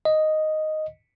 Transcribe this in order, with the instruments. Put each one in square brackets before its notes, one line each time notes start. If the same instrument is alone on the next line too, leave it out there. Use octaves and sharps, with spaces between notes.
[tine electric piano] D#5